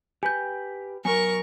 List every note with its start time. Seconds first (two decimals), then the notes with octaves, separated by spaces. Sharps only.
0.23 G4 B4 G5 G#5 G6
1.05 F#3 B3 A#4 G#5 C#6